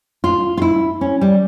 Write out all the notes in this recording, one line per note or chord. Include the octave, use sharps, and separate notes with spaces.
F4
F4
E4
C#4
G3